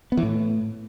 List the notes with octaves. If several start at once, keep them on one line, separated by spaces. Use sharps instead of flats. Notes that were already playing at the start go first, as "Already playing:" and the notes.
B3
E3
A2